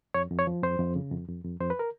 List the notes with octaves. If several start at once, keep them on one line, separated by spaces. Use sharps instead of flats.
F2 C#5
F2
C#5
F3
F2 C5
F2
C#3
F2
F2
F2
F2 C5
B4
A#4